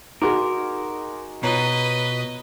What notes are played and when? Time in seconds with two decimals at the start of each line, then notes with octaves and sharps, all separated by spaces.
0.22 D#4 F#4 G#4 A#4 C6 D6
1.43 B2 F4 B4 C#5 D#5 A#5